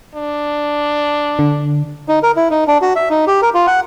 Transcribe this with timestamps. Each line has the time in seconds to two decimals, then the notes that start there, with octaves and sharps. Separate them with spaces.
0.15 D4
1.39 D3
2.08 D#4
2.23 A#4
2.36 E4
2.51 D#4
2.68 D4
2.82 F#4
2.96 E5
3.10 D#4
3.27 G4
3.42 A#4
3.54 F4
3.67 F#5